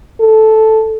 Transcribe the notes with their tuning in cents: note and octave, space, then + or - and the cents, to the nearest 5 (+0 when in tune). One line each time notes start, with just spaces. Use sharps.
A4 -5